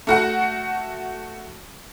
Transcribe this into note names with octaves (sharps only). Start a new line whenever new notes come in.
A3 F#4 F#5